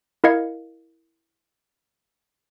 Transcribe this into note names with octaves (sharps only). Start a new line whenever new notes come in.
E4 A#4 D#5 F5 G#6 C#7